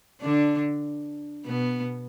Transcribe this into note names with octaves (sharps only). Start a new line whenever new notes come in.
D3 D4
B2 B3